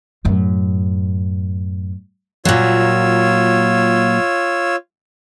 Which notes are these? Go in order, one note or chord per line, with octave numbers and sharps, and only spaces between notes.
F#2 A2
A#2 F#3 F4 C#5 E6